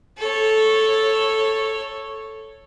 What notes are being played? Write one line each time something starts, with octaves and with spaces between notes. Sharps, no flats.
A4 C#5